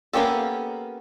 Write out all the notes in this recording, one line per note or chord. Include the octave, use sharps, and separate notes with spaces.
A#3 B3 C#4 G4 A4